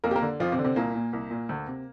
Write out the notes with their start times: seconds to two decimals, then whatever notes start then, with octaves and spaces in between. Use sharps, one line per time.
0.04 F2 A#3 A#4
0.11 G4
0.15 A#3 A#4
0.22 D3
0.40 F2 F3 F4
0.52 C3 C4
0.58 D3
0.64 C3 C4
0.76 C2 A#2 A#3
0.95 A#2
1.13 C2
1.31 A#2
1.49 D2
1.67 C3